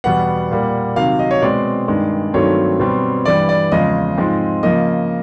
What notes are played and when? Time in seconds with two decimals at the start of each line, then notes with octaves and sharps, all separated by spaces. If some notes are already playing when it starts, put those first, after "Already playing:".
0.04 E2 B2 G3 B3 F#5
0.51 A#2 G3 A#3
0.96 C3 D#3 F#3 F5
1.19 D#5
1.31 C#5
1.42 B2 G#3 C4 D5
1.88 G2 D#3 G#3
2.34 G2 D#3 F#3 A3 C4 C#5
2.79 B2 G3 C4
3.25 G2 E3 G3 D5
3.49 D5
3.72 E2 C#3 F3 G#3 D#5
4.18 G#2 F3 G#3 C4
4.63 C#3 F3 A#3 D#5